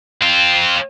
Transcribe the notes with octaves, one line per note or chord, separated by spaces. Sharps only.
C4 F4